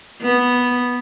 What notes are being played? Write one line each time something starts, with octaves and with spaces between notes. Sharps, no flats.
B3